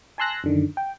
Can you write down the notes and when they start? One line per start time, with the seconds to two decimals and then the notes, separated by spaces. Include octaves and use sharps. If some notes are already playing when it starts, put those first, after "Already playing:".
0.18 G#5 A5 C6 E6 F#6 A#6
0.44 F#2 D3 D#3
0.77 G5